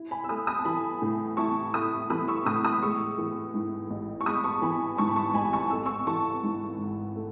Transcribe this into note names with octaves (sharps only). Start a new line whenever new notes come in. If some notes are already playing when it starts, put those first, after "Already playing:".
Already playing: E4
G#5 B5
E6
A3 B5 D#6
B5 D#6
A5
E3 G#5 B5
A2
E4 A5 C#6
A3 B5 D#6
E3 B5 D#6
C#6 E6
A2 B5 D#6
B5 D#6
G#3 C#6 E6
E3
G#2
A1
C#6
G#3 B5 D#6
A5 C#6
E3 G#5 B5
G#2 A5 C#6
B5
A5 C#6
A1 G#5 B5
A5 C#6
A3 E6
C#6 E6
E3 A5 C#6
G#2
G#1
A3